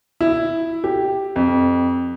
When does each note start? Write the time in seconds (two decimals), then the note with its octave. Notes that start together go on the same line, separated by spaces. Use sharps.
0.21 E4
0.84 G4
1.36 F2